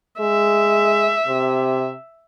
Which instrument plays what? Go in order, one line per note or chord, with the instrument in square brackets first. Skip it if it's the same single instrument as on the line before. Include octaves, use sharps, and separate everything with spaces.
[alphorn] G#3 [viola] E5
[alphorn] C3